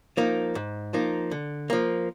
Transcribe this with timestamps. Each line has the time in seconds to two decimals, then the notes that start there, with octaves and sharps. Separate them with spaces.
0.17 F3 A#3 D#4
0.55 G#2
0.93 F3 A#3 D#4
1.31 D3
1.70 F3 A#3